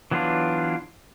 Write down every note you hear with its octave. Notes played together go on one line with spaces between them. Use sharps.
E3 F#3 B3 D4 F4